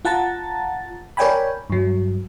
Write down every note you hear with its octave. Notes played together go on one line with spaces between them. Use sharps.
F4 F#5 A5 A#5 A6
A#4 C#5 D5 G5 G#5 B5
G2 F#3